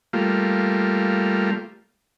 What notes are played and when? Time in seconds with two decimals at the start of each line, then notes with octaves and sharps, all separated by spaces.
0.13 G3 A3 A#3 F4